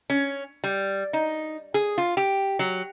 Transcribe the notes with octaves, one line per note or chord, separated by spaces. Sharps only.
C#4
G3
D#4
G#4
F4
G4
F#3